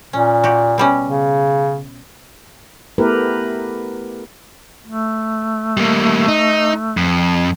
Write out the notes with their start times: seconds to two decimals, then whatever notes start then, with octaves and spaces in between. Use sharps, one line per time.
0.13 A#2 C#4
0.44 F#4 G4
0.78 B2 G3 C#4
1.05 C#3
2.98 A3 B3 E4 G4 A#4 B4
4.87 A3
5.77 G3 A#3
6.28 D#4
6.97 F2